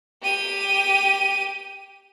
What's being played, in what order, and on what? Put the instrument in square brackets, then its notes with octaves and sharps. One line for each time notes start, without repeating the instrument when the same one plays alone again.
[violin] G4 D#7